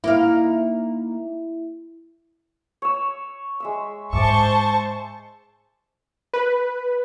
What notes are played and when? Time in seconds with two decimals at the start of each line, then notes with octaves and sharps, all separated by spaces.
0.04 A#3 D#4 E4 F5
2.82 C#5 E6
3.60 G#3 E5 E6
4.13 G#2 C5 E5 A5 C#6 D6
6.33 B4